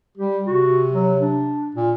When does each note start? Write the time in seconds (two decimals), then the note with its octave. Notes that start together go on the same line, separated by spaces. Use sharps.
0.17 G3 G4
0.46 C3 F#4
0.92 F#3
1.20 D4
1.75 A#2